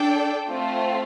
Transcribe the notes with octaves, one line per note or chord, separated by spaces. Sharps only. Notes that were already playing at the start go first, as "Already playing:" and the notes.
Already playing: D4 A4 D5 G5
A3 C4 F4